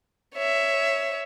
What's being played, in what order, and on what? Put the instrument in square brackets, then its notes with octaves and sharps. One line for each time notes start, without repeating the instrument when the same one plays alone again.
[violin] C#5 E5